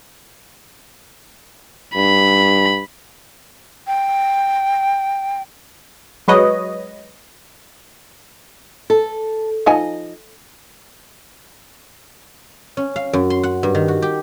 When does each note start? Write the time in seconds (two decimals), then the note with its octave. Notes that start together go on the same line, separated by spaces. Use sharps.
1.96 G2 B5
3.86 G5
6.28 F#3 G#3 B4 C#5 D#5
8.90 A4
9.66 F3 D#4 D#5 G#5
12.77 C#4
12.96 F5
13.13 F#2
13.30 C6
13.43 F#5
13.63 G2
13.75 D#3
13.88 F#4
14.02 G4